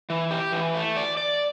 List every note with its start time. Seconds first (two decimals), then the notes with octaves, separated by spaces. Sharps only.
0.10 E3
0.31 G4
0.52 E3
0.75 A3
0.97 D5
1.17 D5